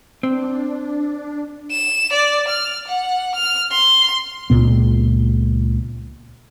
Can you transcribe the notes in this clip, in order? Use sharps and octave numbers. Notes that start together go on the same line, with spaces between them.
C4 D4
E7
D5
F6
F#5
F6
C6
C#2 A#2 B3